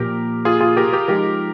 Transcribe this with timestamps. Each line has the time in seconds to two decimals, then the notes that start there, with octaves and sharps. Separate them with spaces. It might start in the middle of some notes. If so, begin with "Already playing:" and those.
Already playing: A#2 F3 A#3 G4 A#4
0.45 F4 G#4
0.60 F4 G#4
0.77 G4 A#4
0.93 G4 A#4
1.08 F3 G#3 D#4 G4 A#4